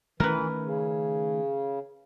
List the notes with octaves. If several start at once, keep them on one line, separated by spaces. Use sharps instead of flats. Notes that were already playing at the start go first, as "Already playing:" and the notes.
D#3 E3 A3 C#4 A#4 B4
C#3